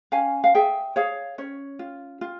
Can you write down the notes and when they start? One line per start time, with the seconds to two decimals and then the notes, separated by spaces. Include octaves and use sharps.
0.12 C#4 F5 G#5
0.44 F5
0.55 G#4 E5 G5
0.96 G#4 C#5 F5
1.38 C#4 C#5
1.79 F4
2.21 F4